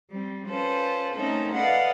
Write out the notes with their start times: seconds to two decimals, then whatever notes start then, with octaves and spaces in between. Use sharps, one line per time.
0.10 G3 C4
0.47 C#4 F4 A4 B4 C5
1.15 A3 C4 C#4 D#4 A4 A#4
1.52 A4 B4 D5 D#5 F5 F#5